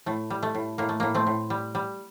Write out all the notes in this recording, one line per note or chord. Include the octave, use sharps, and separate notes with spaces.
A2 A3
G3
A3
A2
A2 A#3
A3
A2 A#3
A3 C4
A2
G3
G3